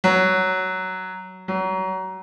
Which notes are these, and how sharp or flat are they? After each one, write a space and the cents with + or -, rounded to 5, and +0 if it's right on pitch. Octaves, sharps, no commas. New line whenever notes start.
F#3 +10
F#3 +30